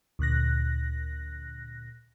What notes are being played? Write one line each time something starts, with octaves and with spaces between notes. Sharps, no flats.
D2 A#2 F#6 A#6